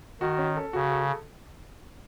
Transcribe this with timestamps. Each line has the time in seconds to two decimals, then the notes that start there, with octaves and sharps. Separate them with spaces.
0.21 D#3 F#4
0.38 C#4
0.57 A4
0.73 C#3 F#4
0.92 A4